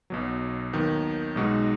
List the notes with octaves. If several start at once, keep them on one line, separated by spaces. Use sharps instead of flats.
B1 B2 F#3
D#2 D#3 F#3 B3 D#4
B1 B2 G#3 D#4 F#4